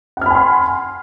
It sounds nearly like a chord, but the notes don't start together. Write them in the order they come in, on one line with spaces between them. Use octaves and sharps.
F#5 F6 B5 G#5 C6